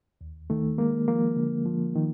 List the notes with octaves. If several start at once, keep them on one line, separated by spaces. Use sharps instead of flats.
D#2
D#3 A3
G#3 A#3
F3 A#3
D3
F3
D#3